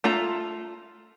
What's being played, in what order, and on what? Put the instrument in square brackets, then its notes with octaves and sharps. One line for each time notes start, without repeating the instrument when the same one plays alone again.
[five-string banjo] A3 F4 A#5